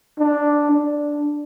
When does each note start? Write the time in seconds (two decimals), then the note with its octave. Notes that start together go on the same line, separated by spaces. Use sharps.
0.19 D4
0.72 D4